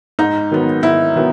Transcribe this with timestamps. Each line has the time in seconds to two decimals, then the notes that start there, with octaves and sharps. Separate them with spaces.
0.19 G#2 D#4
0.51 D#3 F#3 B3
0.83 G#2 E4
1.16 D#3 F#3 B3